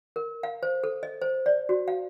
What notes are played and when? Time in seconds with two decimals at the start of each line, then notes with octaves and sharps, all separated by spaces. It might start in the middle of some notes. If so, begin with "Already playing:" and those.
0.16 A#4
0.43 F5
0.63 C5
0.84 A4
1.03 D#5
1.21 C5
1.46 D5
1.69 F#4
1.88 F5